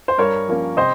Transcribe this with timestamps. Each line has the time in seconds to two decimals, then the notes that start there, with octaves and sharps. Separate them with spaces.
0.08 C5
0.18 G2 A#4 C#5
0.48 F3 A#3 C#4
0.77 C3 C5 D#5